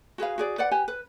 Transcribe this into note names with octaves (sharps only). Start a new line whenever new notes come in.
F#4 G#4 B4 F5
F#4 G#4 D5
B4 D5 F#5
G4 B4 G#5
B4